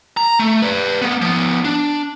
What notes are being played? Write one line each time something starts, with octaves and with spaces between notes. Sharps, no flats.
A#5
A3
B4 D5
A#3 B3
F3 B3
D4